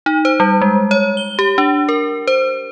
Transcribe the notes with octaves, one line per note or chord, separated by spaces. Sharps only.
D#4
C5
G3
G#3
C#5
G7
G4
D4
A#4
C5